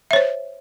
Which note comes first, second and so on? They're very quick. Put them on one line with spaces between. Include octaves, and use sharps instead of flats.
E5 C#5 C5